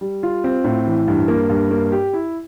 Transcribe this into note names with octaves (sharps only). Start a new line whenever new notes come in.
G3
F4
C4
A2
E3
G2
A#3
G2
A#3
G4
E4